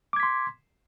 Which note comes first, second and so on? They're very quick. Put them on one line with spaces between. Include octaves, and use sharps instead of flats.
D6 G#6 B6 C6